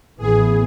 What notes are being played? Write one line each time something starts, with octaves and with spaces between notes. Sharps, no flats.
A1 A2 E3 B3 G#4